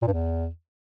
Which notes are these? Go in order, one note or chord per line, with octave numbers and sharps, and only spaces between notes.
A#2
G2
E2